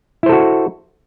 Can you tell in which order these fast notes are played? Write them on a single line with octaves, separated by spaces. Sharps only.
E4 C5 A4 F#4